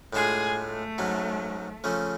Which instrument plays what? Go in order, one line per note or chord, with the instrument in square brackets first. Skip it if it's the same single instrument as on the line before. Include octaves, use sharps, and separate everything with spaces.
[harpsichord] A2 G#3 D4 F4 [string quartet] G#4
[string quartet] A3
[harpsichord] G#2 F#3 C#4
C#3 F3 A3 C#4